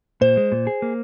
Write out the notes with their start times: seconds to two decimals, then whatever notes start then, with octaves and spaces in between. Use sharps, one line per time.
0.21 A#2 C5
0.37 G#3
0.52 A#2
0.67 G#4
0.82 A#3